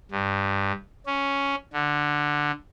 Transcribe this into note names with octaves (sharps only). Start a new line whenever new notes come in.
G2
C#4
D3